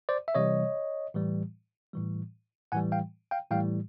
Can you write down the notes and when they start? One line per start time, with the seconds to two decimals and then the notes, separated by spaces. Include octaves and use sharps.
0.09 C5 D5
0.28 E5
0.35 C3 E3 G3 C#5 D#5
1.14 A2 E3 G3
1.93 A2 E3 G3
2.72 A2 E3 G3 F#5 G#5
2.92 F5 G5
3.31 F5 G5
3.51 A2 E3 G3 F5 G5